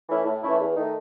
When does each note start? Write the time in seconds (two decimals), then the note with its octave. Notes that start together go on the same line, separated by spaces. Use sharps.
0.09 E3 A3 C#4 E4
0.26 A2
0.43 E3 A3 C#4 E4
0.60 E2
0.77 D#3 A3 D#4